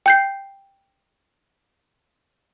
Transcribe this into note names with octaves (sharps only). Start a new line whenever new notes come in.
G5 G6 C7